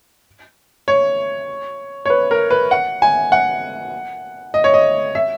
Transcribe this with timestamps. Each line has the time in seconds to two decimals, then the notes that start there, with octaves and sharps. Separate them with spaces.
0.88 C#5
2.06 C#5
2.10 B4
2.31 A#4
2.51 B4
2.71 F#5
3.02 G#5
3.32 F#5
4.54 D#5
4.64 C#5
4.74 D#5
5.15 E5